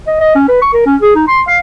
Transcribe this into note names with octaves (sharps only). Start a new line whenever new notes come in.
D#5
D#5
C#4
B4
C#6
A#4
C#4
G#4
D#4
C6
F5